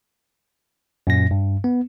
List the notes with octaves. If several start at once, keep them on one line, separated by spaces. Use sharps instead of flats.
F#2 A#2 A#6
G2
B3